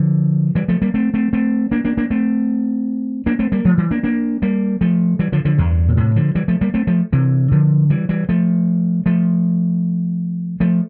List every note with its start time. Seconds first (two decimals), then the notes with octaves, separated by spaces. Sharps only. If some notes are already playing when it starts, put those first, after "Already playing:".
Already playing: D3 F3
0.55 E3 G3
0.68 F3 A3
0.82 G3 A#3
0.94 A3 C4
1.14 A3 C4
1.33 A3 C4
1.72 A#3 D4
1.85 A#3 D4
1.97 A#3 D4
2.10 A3 C4
3.26 A#3 D4
3.39 A3 C4
3.52 G3 A#3
3.65 F3 A3
3.78 E3 G3
3.91 A#3 D4
4.03 A#3 D4
4.42 G3 A#3
4.81 F3 A3
5.19 E3 G3
5.32 D3 F3
5.45 D3 F3
5.58 E2 G2
5.88 A#2
5.97 A2 C3
6.16 D3 F3
6.35 E3 G3
6.48 F3 A3
6.61 G3 A#3
6.74 A3 C4
6.87 F3 A3
7.13 C3 E3
7.52 D3 F3
7.90 E3 G3
8.09 E3 G3
8.29 F3 A3
9.06 F3 A3
10.60 F3 A3